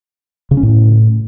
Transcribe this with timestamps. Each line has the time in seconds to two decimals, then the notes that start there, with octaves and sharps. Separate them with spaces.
0.51 C#3
0.57 C#4
0.63 A2